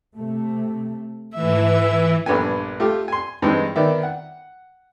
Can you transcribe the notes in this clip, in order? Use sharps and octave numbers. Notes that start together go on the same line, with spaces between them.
C3 A3
G#2 E3 A3 E5
A#1 G2 B3 A4 G#5
A3 F4 G4
G#5 C6
G2 E3 G#3 C4 D#4
D#3 B3 D5 E5
F#5